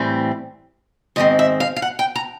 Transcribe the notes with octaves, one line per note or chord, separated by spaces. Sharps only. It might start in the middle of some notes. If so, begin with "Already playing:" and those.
Already playing: A2 E3 G3 C4
G#2 D#3 G#3 C4 D#5
E5
F5
F5
F#5
G5
A#5